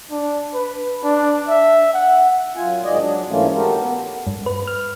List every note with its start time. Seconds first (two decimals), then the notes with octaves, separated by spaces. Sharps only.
0.11 D4
0.54 B4
1.04 D4
1.48 E5
1.94 F#5
2.56 F#2 F4 G#5
2.84 G#2 D#3 G#4 D5 D#5
2.98 F#3 D4
3.28 G#2 E3 A3 A#3 C#4 F4
3.53 F#4 G4 A4 A#4
3.76 B3
4.27 G2
4.46 B4
4.67 F6